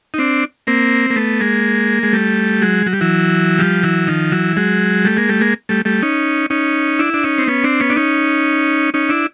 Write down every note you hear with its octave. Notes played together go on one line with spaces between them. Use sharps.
D#4
C4 D4
A#3 C4
A#3
A3 B3
G#3 A#3
G#3
G3 A3
F#3 G#3
F#3
G3
E3 F#3
F3 G3
E3 F#3
D#3 F3
E3 F#3
F#3 G#3
G3 A3
G#3 A#3
G3 A3
G#3 A#3
G3 A3
G3 A3
C#4 D#4
C#4 D#4
D4 E4
D4
C#4 D#4
C4
B3 C#4
C4 D4
B3 C#4
D4
C#4 D#4
C#4 D#4
D4 E4